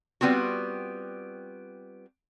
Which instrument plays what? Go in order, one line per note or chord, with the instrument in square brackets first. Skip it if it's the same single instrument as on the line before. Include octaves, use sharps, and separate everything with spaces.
[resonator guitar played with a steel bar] G3 B3 C4 F4 F#4